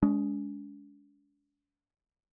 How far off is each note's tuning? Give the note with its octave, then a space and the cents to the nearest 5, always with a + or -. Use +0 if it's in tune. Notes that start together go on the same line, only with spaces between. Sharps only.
G#3 +0 D4 -45